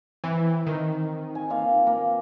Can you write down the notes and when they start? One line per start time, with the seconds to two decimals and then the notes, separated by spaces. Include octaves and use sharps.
0.24 E3 C4
0.67 D#3
1.35 G#5
1.50 A#3 F4 F5
1.87 A#3